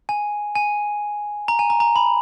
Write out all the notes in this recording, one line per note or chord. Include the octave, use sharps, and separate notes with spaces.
G#5
G#5
A#5
G#5
A#5
A#5
B5